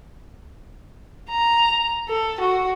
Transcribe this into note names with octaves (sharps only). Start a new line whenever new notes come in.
A#5
A4
F#4